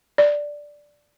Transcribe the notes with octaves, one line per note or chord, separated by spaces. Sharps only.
D5